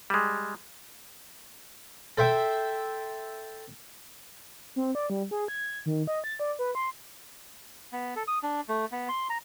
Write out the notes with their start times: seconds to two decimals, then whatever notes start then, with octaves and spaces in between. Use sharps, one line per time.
0.10 G3 G#3
2.17 A4 C5 E5 G5
4.76 C4
4.95 D5
5.10 G3
5.31 G#4
5.48 G#6
5.86 D#3
6.07 D#5
6.24 A6
6.39 D5
6.59 B4
6.75 C6
7.93 B3
8.16 A4
8.28 D#6
8.43 D4
8.69 A3
8.92 B3
9.09 C6
9.30 A#5